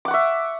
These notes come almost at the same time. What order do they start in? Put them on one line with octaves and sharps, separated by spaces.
D6 F#5 C#6 E5